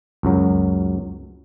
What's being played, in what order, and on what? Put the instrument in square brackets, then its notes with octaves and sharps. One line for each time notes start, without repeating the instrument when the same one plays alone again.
[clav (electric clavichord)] C#2 F#2 F#3